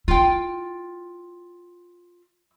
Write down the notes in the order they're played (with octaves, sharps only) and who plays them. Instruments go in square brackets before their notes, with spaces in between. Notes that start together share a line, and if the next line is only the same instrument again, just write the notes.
[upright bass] E4 [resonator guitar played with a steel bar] F4 G5